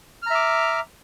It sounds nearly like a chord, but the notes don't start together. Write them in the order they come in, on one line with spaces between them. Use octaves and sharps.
F6 A#5 E5 D6